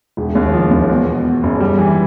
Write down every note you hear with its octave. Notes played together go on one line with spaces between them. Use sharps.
E1
D#2
F3
D#2
E2
B2
B2
F#1
G3
E3